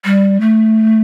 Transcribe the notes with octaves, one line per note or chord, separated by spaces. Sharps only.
G3
A3